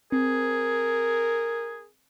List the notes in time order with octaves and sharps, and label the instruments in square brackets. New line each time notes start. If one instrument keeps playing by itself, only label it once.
[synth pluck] C4 [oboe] G#4 [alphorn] A#4